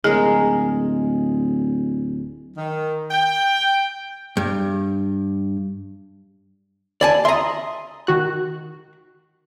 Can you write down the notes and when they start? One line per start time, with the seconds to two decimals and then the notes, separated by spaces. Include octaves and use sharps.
0.04 D1 G#3 G#4 A#4
2.56 D#3
3.11 G5
4.37 G2
7.01 D#2 D5 G#5 A5
7.25 E5 A#5 C6 D#6
8.07 D#3 F#4 F#6